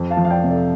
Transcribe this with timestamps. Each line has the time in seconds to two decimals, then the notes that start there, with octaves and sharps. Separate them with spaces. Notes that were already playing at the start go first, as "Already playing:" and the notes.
Already playing: F2
0.10 F5 A5
0.17 F3
0.25 F5
0.30 D5 G5
0.43 C3
0.50 A4 D5